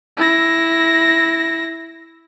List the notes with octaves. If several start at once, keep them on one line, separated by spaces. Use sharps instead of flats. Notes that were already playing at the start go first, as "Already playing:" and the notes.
E4 A#6